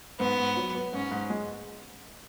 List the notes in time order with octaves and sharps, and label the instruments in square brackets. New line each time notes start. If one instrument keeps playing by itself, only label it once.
[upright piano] G#2 [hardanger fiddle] B3
[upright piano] G#2
F#3
B3
[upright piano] G#2 [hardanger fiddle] C#4
[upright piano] G#2
G#3